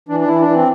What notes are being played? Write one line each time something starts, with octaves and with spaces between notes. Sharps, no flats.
E3 D4
D4
E3 E4
D4
E3
C4